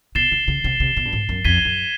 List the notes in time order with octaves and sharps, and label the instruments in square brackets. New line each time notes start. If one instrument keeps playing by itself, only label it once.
[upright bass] B2 [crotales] A6 C7 E7 G7
[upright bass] C#3
C#3
C3
C3
B2
G2
G#2
F#2
[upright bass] F2 [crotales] G#6 B6 D#7 G7
[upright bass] F#2